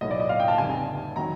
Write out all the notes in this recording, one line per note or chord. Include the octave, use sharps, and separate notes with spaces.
B1 A2 F#3 D#5
D5
D#5
F5
G5
A5
F1 F2 D3 G3 G#5
D#3 F#3 A#5